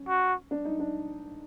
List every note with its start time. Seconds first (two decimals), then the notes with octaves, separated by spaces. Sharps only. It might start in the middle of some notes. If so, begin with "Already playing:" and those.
Already playing: C#4
0.08 F#4
0.51 D4
0.65 D#4
0.80 D4